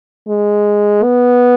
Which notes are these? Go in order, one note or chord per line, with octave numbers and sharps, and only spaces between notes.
G#3
B3